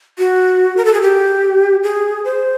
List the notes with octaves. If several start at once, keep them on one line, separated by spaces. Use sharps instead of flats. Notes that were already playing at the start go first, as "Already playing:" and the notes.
F#4
A#4
A4
G#4
G4
G#4
C5